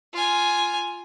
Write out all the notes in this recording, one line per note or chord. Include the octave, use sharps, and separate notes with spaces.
F4 G#5